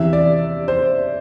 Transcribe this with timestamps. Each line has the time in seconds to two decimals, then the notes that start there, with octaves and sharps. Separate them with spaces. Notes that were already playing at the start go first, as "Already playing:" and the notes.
Already playing: E2 C3 E3 E5
0.13 D5
0.68 C5